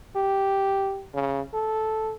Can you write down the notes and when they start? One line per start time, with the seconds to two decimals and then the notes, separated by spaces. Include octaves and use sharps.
0.16 G4
1.14 C#3
1.54 A4